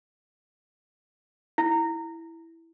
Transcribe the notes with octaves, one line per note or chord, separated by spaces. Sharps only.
E4